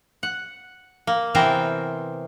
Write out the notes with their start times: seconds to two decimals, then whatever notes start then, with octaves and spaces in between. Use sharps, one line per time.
0.23 F#5
1.07 A#3
1.34 C3 E3 B3 C4 A#4 C5